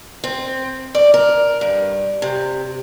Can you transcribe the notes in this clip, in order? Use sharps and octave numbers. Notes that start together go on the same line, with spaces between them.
C4
D5
A#4
G2
C3